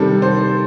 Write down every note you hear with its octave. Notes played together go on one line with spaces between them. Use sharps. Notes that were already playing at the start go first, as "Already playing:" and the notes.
Already playing: C3 D#3 G3 A4
C5